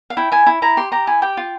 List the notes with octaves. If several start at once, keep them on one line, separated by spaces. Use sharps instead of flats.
F5
E4 G5
E4 G#5
E4
E4 A#5
G4 C6
G4 A#5
E4 G#5
G4 G5
F4